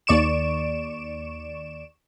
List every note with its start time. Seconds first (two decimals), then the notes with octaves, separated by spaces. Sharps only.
0.07 D#2 D5 C#6 D7 E7